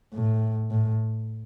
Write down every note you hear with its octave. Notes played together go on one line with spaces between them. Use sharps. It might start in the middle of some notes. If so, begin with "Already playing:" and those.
A2
A2